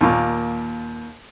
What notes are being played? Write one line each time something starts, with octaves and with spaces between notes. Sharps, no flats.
D#2 A#2